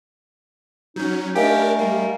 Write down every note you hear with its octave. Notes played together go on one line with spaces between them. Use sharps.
F#3 C#4 D#4
A3 D4 G4 A#4 D#5 F5 G#5
G3 A#3